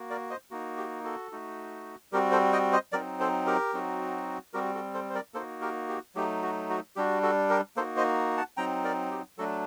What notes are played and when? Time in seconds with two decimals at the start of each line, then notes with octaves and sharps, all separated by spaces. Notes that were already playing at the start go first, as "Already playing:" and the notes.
Already playing: A#3 F#4
0.10 A#4 D5
0.30 C5 D#5
0.51 A#3 D#4 F#4
0.77 G4
1.04 F#4 A4
1.32 A3 D#4 F#4
2.12 G3 C4 F#4 G4 A#4
2.32 A4 C5
2.52 D#5 G5
2.73 C5 D#5
2.92 F#3 C4 D#4 A#4 D5
3.20 A4 C5
3.47 G4 A#4
3.73 F#3 C4 D#4 F#4
4.53 G3 C4 F#4 G4 A#4
4.74 F#4 A4
4.94 A4 C5
5.10 C5
5.14 A#4 D5
5.34 A#3 D#4 F#4 A4 C5
5.61 G4 A#4
5.89 G4
6.15 F#3 A3 D#4 G4
6.43 F#4
6.70 F#4
6.96 G3 D4 F#4 G4
7.22 F#4 A4
7.50 G4 A#4
7.76 A#3 D#4 F#4 A4 C5
7.97 C5 D#5
8.37 F#5 A5
8.57 F#3 C4 D#4 G5 A#5
8.84 A#4 D5
9.11 G4
9.38 F#3 A3 D4 F#4 A4